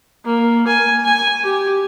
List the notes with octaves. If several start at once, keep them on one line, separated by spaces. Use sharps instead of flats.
A#3
G#5
G#5
G4